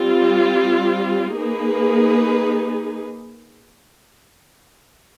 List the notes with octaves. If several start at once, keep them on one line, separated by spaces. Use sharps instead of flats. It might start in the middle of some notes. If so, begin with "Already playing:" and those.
Already playing: G3 C4 F4
A#3 D#4 G#4 B4